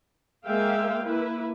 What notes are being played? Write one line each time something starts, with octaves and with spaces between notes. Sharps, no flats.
G#3 A#3 G#4 E5 F5 G5
A#3 E4 B4